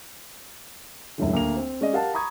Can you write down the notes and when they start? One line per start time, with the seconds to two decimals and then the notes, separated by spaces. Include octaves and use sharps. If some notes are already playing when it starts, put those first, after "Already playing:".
1.18 F#1 C#2 A2 D3
1.33 D2 A#3 F7
1.57 C4
1.81 G#3 C#4 D5 D#5
1.93 G4 A#4 F5 F#5 A5
2.14 A#5 B5 C#6 D#6 G#6